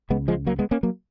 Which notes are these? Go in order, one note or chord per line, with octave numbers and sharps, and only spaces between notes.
C#2 C#3 G#3 B3
F3 G#3
F#3 A#3
G#3 B3
A#3 C#4
F#3 A#3